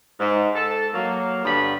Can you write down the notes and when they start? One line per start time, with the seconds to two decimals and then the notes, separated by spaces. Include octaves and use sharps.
0.20 G#2
0.55 A4
0.93 F#3 A#3
1.45 G2 D3 B3 B5